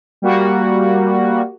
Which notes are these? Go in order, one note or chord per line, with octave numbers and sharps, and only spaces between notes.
G3 A#3 F#4